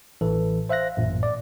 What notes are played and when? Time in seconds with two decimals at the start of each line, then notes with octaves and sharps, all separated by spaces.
0.21 A1 E3 A4
0.69 C5 E5 F5 F#6 A#6
0.98 A1 F#2 A#2
1.23 D5